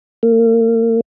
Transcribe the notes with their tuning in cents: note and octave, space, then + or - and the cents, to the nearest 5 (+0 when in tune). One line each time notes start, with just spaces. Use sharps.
A#3 -35